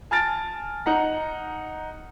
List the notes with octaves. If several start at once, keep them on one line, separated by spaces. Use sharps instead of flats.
G#5 A5 F6 A6 D7
D#4 F#5 A#5